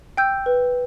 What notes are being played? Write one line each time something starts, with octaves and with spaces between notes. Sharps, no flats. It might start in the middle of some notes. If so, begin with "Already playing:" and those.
G5 E6 G6
B4